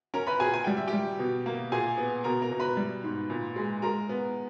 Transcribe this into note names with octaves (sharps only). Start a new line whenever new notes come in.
C#4 A#4 A#5
B4 B5
A#2 G#4 G#5
G#5
G3 G5
E5
G4 G5
G3
B2
A#3
A#2 G#4 G#5
B3
B2 A#4 A#5
A#4 A#5
B2
B4 B5
G3
G#2
A#2
G#3
G#3 A#4 A#5
B3